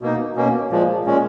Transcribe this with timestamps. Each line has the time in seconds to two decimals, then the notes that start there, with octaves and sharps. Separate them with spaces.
0.02 B2 A#3 D#4
0.36 B2 A#3 C#4
0.71 A#2 F3 G#3
1.05 A#2 G#3 C#4